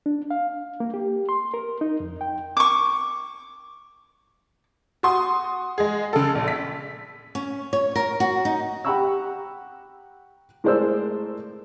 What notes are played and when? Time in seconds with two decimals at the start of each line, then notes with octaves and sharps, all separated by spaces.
0.06 D4
0.31 F5
0.80 A#3
0.94 G4
1.29 C6
1.54 A#4
1.81 D#4
2.00 F2
2.21 G5
2.57 C#6 D6
5.03 F#4 C6 D#6
5.78 G#3 G#4
6.13 C#3 A4
6.35 A#1
6.48 B6
7.35 C#4
7.73 C#5
7.95 A#4
8.20 F#4
8.45 D#4
8.84 G4 F#5 A#5 B5 C#6 E6
10.64 A2 G#3 A#4 C5 D5 E6